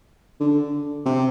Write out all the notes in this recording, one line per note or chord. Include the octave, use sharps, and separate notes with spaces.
D3
C3